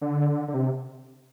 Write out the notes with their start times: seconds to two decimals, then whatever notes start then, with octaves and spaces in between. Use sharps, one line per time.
0.01 D3
0.48 D3
0.54 C3